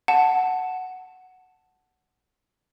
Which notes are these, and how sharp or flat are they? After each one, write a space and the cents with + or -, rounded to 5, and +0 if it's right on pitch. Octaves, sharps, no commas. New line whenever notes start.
F#5 +0 A5 +0